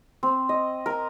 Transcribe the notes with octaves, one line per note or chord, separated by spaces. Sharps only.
C4
D#5
A#4